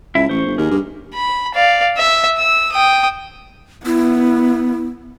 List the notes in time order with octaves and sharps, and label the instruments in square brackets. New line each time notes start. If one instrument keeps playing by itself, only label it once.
[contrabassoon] C#2 [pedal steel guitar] E4 E5
[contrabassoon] A1 [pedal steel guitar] C5 C#6
[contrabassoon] G1
[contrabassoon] D#2 [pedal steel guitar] G#4 A#4
[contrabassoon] G2
[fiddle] B5
D5 F5
E5
E6
G5 D#6
[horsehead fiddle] B3 [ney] E4